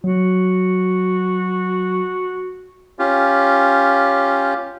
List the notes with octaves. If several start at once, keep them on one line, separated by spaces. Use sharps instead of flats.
F#3 F#4
C#4 F4 G4